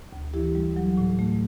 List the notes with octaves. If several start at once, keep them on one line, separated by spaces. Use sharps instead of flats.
D2
E3 E4 G4
G3
F#3
A2
A3